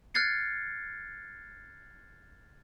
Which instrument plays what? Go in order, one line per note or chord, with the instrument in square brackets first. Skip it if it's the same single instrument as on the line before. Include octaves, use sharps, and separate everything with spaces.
[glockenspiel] F6 F#6 G#6 A6 C7 C#7